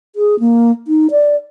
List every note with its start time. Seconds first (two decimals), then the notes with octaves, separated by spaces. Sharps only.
0.16 G#4
0.40 A#3
0.88 D#4
1.11 D5